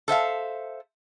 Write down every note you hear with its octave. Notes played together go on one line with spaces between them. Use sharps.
A4 C5 E5 F5